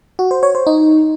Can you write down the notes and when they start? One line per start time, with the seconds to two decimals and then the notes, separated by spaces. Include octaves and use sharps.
0.19 F#4
0.31 C5
0.43 C#5
0.55 C5
0.67 D#4